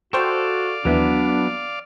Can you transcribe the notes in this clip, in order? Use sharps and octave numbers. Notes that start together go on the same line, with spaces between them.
F#4 A4 C5 D5 F5 G5 C#6
D#2 E3 F#3 B3 D4